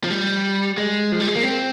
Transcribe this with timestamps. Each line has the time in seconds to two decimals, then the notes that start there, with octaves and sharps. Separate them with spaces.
0.04 F3
0.10 G3
0.78 G#3
1.12 F3
1.20 G3
1.27 G#3
1.36 A#3
1.43 C4